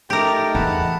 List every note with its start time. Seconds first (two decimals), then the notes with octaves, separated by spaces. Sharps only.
0.10 A3 D#4 G4 A#4
0.55 E2 F#5 A5 B5